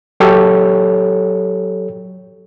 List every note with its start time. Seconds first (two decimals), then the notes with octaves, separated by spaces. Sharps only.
0.20 F#3 G4 A4 C#5